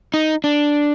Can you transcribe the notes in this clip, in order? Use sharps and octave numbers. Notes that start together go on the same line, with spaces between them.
D#4
D4